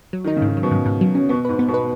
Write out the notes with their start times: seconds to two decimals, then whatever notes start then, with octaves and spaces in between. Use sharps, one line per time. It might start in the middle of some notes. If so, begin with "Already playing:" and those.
0.13 F#3
0.24 D#3 D#4
0.36 C#3
0.42 G#2
0.48 D#3
0.57 F#3
0.63 B2
0.71 G#2 C#3
0.86 G#2
1.01 F#3
1.15 C#4
1.29 B2 B3
1.45 G#2 B4
1.59 B3
1.68 B2
1.74 B4